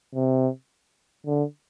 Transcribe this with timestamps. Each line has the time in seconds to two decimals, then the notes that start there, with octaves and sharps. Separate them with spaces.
0.15 C3
1.26 D3